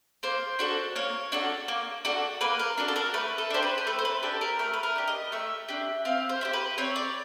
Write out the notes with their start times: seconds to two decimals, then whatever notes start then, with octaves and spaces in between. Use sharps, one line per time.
0.23 A#3 C5
0.59 D4 F#4 A4
0.96 A#3 C#5
1.32 D4 F#4 A4
1.68 A#3
2.05 D4 F#4 A4
2.41 A#3 B4
2.59 A#4
2.78 D4 F#4 A4
2.88 A4
2.96 A#4
3.14 A3 B4
3.38 A4
3.50 D4 G4 C5
3.63 B4
3.78 C5
3.87 A3 B4
3.99 C5
4.05 B4
4.23 D4 G4 A4
4.41 A#4
4.59 A3 A#4
4.73 B4
4.83 A#4
4.96 D4 G4
5.08 D#5
5.32 A3 E5
5.68 D4 G4
6.05 C4 F5
6.29 C5
6.41 E4 G4 C5
6.53 B4
6.78 C4 C#5
6.96 D5